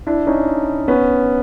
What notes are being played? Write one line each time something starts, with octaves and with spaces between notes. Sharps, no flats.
D4 E4
C#4 D#4
B3 C#4